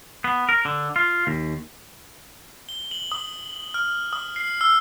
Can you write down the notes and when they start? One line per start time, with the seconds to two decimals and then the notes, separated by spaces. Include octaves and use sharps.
0.24 B3
0.49 A#4
0.65 D3
0.96 F4
1.27 D#2
2.69 G7
2.91 F#7
3.12 D#6
3.74 F6
4.13 D#6
4.36 C7
4.61 E6